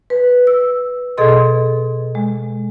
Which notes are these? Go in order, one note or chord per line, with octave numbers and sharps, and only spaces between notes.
B4
E6
B2 G#4 A4 D#5 C6
G#3